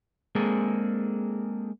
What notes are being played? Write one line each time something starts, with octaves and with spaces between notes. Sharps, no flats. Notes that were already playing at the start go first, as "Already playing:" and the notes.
G#3 A#3 C4 D4 G#4 A4